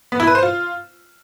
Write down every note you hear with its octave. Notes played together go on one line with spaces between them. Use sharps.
B3
E4
B4
C5
F4